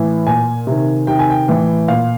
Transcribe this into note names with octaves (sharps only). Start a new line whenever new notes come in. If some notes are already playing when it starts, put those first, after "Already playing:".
Already playing: A2 E3
A#2 G#5
C3 D#3
C3 D#3 G5
G#5
G5
A2 E3
A#2 F5